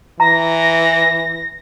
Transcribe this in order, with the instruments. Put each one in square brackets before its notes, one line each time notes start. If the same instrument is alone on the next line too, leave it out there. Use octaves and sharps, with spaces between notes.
[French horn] E3 [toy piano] A#5 [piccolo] A#6